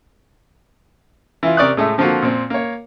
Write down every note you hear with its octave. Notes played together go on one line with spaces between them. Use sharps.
E3 E4 F4
C3 A#4 D5 C#6 D#6 F#6
A2 G#3 A3
D3 F3 A#3 C4 F4 F#4
A#2 C4
A#3 C#5